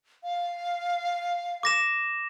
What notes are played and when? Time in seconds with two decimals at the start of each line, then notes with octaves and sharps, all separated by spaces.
0.24 F5
1.63 D6 A#6 E7